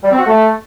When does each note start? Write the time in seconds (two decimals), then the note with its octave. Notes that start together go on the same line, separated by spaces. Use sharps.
0.03 G3
0.11 C4
0.19 F#4
0.26 A3